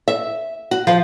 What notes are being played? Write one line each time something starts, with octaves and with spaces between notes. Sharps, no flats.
E5
F#4
F3